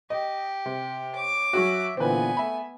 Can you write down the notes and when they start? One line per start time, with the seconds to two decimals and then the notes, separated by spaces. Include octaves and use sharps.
0.10 G4 D#5
0.66 C3
1.15 C#5 D6
1.53 F#3 C#4 F#4 E5
1.97 A#2 D3 E3 B3 C4 B4 G#5
2.37 A3 E5 B5